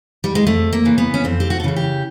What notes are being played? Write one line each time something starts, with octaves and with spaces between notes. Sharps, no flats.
G3
G#3
F2 A3
A#3
C#3 E3
B3
C#4
F2 C4
G4
F#4
A4
C#3 E3 G#4
G4